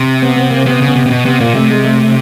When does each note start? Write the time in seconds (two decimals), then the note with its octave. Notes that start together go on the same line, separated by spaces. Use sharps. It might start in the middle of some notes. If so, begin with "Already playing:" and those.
Already playing: C3
0.22 B3
0.36 B3
0.51 A#3
0.66 C3 B3
0.81 C#3
0.88 B3
0.96 C3
1.06 C3
1.11 B2
1.25 C3 B3
1.40 A#2 A#3
1.55 C3 A3
1.70 G#3
1.85 A3
1.99 A3